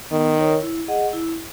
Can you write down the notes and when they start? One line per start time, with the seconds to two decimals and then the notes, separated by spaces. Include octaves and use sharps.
0.11 D#3 B3
0.37 D#4 A#4 C#5
0.62 E4
0.88 G#4 D#5 F#5
1.13 E4